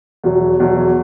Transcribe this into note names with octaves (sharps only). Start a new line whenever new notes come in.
E2 B2 F#3
E2 B2 F#3